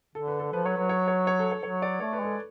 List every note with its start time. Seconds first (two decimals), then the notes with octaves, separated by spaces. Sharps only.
0.15 D3 A4
0.27 B4
0.40 A4
0.53 F3 B4
0.64 F#3 C#5
0.77 F#3 B4
0.89 C#5
1.08 C#5
1.27 C#5
1.39 A4
1.52 C#5
1.63 F#3 C#5
1.82 D5
2.00 A3 C#5
2.13 B4
2.20 G#3 A4